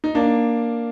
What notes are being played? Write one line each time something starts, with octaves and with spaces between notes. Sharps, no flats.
D#4
A#3 D4